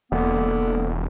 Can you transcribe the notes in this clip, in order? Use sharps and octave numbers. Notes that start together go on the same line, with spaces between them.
E1 D3 A#3 B3